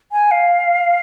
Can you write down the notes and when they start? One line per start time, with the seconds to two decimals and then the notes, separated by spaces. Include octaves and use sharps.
0.12 G#5
0.31 F5